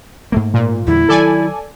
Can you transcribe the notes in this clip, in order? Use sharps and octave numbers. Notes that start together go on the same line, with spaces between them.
G#2 A3 A#3
A#2
E2 D3 G3 E4
D#3 F#3 A4 D5 G#5